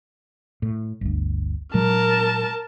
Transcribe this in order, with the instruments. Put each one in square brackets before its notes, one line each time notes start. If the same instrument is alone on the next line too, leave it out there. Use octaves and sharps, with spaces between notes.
[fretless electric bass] A2
G1 D2
[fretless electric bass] A#2 F#3 G#3 [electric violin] A#4 A5